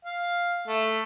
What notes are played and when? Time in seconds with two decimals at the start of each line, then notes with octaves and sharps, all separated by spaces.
0.05 F5
0.67 A3